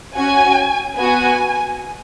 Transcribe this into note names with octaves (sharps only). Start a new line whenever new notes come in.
C#4 F#4 G#5
B3 F#4 G#5